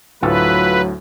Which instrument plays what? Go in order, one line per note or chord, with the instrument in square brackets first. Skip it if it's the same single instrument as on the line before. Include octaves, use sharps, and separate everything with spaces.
[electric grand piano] D2 A2 [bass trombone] F#3 [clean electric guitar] F4 A4 [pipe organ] B4